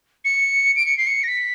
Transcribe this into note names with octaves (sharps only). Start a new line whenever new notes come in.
C#7
D7
C#7
C7
C#7
A#6
B6